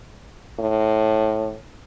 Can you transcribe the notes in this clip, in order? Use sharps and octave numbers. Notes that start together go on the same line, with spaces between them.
A2